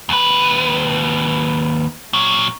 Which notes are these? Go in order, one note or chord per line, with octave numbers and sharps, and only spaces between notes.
D#2 B4
A#2 F#3